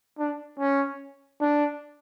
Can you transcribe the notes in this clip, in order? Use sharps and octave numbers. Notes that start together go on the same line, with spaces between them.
D4
C#4
D4